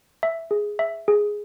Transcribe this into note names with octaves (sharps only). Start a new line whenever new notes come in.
E5
G#4
E5
G#4